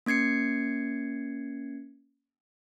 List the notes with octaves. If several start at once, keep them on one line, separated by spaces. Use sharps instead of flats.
A#3 C#4 G#6 C7 C#7